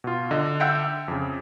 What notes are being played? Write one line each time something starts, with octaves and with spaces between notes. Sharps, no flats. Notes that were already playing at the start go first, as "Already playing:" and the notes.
B2 F4
D3 D#5
E5 F#5 G5
F2 C#3